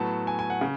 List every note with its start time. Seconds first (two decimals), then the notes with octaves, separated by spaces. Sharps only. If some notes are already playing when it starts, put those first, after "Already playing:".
Already playing: A2 F#3 B3 A5
0.27 G#5
0.39 G#5
0.50 F#5
0.61 C#3